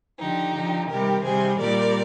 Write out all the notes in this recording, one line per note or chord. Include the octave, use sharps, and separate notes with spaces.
D3 F3 D#4 G4
D3 F3
C3 D#3 G3 G4 A#4
C3 D#3 G3 G#4 C5
A#2 G3 A#4 D5